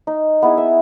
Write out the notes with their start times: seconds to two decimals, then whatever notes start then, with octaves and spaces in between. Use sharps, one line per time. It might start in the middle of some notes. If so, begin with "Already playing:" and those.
0.07 D#4
0.42 B3 E4 G#4
0.58 E5